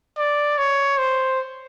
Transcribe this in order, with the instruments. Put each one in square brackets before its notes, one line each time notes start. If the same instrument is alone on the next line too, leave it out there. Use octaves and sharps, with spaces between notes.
[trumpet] D5
C#5
C5